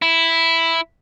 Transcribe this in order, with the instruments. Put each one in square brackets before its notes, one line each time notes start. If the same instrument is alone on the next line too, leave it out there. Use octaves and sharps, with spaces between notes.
[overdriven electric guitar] E4